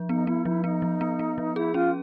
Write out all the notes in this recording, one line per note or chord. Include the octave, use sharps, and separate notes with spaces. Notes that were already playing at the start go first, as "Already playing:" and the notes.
Already playing: F3
B3 D#4
B3 E4
F3 E4
B3 D#4
F3
B3
B3
F3
E4 G#4
C#4 F4